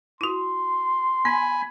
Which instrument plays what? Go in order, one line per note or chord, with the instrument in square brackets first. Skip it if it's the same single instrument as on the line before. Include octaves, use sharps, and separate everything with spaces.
[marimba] E4 F#4 [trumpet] C6
[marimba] B3 [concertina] G#5 B5